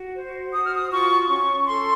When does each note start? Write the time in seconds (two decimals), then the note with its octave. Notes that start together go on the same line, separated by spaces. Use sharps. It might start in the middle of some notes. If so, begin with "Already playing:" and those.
Already playing: F#4
0.16 C5
0.53 F#4 D#6
0.64 F6
0.75 D#6
0.91 F4 C#6
1.29 C#4 C#6
1.67 A4 C6